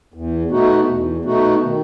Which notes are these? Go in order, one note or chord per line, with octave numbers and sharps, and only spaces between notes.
E2
B2 A3 D#4 F#4
E2
B2 A3 D#4 F#4
D#3